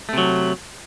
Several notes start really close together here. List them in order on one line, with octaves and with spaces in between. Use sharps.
A3 C3 F#3